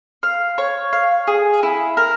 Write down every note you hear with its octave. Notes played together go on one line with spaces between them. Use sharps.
F5
C#5
F5
G#4
E4
A#4